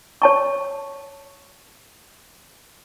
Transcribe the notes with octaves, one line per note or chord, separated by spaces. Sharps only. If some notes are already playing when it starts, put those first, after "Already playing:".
C#5 A5 C#6